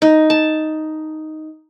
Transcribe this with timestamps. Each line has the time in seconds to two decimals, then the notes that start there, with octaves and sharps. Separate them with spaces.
0.02 D#4
0.30 A5